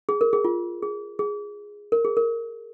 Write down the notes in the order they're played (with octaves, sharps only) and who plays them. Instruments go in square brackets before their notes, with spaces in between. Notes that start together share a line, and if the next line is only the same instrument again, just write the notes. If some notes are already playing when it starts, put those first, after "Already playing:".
[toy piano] G#4
A#4
G#4
F4
G#4
G#4
A#4
G#4
A#4